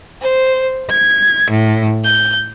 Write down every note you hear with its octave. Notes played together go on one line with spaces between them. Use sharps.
C5
G#6
A2
G6